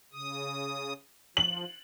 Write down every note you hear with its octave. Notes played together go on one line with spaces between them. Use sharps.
C#3 D#6
F3 F#7